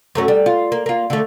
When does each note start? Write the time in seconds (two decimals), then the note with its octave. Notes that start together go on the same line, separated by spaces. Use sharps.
0.15 F#2 A3 C#4
0.28 G3
0.46 F4
0.72 A#3
0.86 A#3 F4
1.10 D3 A3